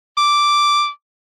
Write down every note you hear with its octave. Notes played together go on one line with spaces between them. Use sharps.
D6